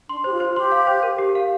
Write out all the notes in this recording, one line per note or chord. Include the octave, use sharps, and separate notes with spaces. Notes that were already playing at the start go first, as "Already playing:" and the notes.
D4 C6
G4 C5
F4
C5
G4 C6
F5
C5
A#4
G4
F5